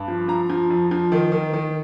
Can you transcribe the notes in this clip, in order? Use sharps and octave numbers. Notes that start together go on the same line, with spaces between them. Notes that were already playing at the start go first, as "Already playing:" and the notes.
Already playing: G2
F3
F3 A#5
F3
F2
F3
D#3
D#3
D#3